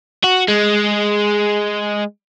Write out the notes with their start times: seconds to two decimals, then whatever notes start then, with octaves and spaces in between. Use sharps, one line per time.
0.24 F#4
0.48 G#3